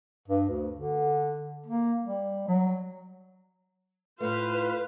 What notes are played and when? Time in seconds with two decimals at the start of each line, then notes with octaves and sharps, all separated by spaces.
0.28 G2
0.49 D2
0.76 D3
1.67 A#3
2.03 G3
2.48 F#3
4.20 A2 A3 F4 B4 C5 F5